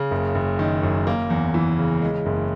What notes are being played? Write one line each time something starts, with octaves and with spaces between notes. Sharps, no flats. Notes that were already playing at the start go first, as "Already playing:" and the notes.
Already playing: C#3
F#1
F#1
D#3
F#2
A#3
E2
E3
C#3
G#3
F#1